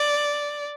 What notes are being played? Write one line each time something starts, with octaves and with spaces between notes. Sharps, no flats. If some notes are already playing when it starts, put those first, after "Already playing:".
Already playing: D5